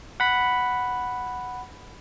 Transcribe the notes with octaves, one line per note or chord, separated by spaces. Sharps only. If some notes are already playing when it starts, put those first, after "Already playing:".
F#5 B5